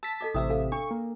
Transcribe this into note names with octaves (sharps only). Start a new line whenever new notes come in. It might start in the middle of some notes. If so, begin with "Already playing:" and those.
A5 E6 B6
A4 D#5 D6
A1 C3 E5 D#6 E6
A4 F5
D4 C#6
A#3